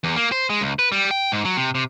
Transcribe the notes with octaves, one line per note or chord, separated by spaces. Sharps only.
E2
A#3
C5
G#3
C#2
B4
G3
G5
G#2
F#3
C3
C3